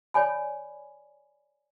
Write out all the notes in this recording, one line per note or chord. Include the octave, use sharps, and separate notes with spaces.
C#5 D5 G#5 B5